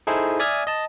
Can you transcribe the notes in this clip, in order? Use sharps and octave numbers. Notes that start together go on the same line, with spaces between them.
D#4 E4 G#4 A4 C5
D5 E5 G#5 D#6 F6 G#6
D#5 A5